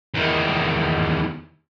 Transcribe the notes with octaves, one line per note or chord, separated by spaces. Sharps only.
E2 D#3